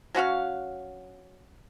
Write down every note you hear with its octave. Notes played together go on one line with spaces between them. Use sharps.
F#3 C#4 F#4 F5